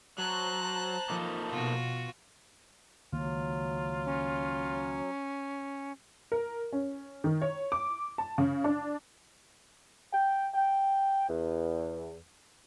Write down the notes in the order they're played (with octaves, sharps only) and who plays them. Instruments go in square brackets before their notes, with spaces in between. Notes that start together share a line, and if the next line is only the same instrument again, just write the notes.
[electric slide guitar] F#3 [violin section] C5 A5 A#5 [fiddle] F#6
[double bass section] F3 [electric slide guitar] A#3 D#4 A4
[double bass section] B2 [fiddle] F4 F#4
[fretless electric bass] C#2 D#3 A#3 [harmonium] F#3 [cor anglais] F4
[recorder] C#4
[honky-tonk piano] A#4
C#4
D#3
C#5
D6
A5
C#3
D4
[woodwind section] G5
G5
E2